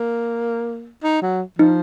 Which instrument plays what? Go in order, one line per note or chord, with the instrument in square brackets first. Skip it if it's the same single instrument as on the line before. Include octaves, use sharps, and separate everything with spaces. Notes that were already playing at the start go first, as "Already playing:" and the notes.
Already playing: [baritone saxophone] A#3
D#4
F#3
[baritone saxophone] F3 [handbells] D#4